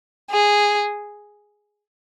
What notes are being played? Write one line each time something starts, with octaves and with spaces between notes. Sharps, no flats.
G#4